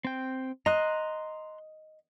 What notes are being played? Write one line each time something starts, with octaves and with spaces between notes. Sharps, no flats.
C4 G5
D#5 A#5 C6 F#6